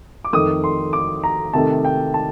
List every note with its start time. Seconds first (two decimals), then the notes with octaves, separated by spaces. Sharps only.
0.25 D6
0.33 F2 D#3 A3 D#6
0.64 C6
0.93 D6
1.24 A#5
1.53 C3 D#3 A3 A5
1.85 G5
2.14 A5